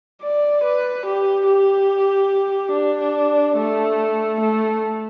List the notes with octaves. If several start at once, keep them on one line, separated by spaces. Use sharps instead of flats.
D5
B4
G4
G4
D4
A3
A3